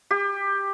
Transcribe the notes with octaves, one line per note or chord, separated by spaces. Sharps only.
G4